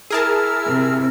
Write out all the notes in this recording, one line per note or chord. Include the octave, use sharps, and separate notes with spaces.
E4 G#4 A#4 A5 E6 F6
C3